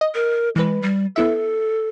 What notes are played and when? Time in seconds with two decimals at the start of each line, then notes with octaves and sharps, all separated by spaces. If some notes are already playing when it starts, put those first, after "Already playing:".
0.01 D#5
0.14 A#4
0.56 E3 G#3 B4
0.82 G3
1.16 B3 E4 A4 E5